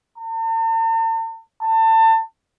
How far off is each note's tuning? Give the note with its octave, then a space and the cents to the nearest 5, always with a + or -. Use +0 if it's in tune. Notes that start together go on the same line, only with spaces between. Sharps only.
A5 +45
A5 +30